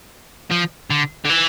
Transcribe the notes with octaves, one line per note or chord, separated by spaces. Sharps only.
F3
D3
D3
E3